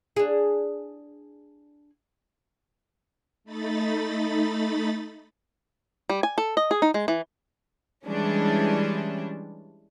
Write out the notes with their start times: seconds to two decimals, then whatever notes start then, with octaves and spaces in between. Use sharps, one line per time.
0.17 D4 G#4
3.44 A3 D#4 B5 A6
6.10 G3
6.23 G#5
6.38 A4
6.57 D#5
6.71 G#4
6.82 D#4
6.94 G#3
7.08 E3
8.05 E3 G3 G#3 C#4 D4